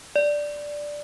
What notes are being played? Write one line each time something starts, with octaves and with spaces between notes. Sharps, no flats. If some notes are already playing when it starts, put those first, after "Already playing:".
D5